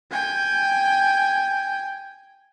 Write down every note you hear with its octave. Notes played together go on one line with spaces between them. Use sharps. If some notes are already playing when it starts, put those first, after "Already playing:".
G5 G#5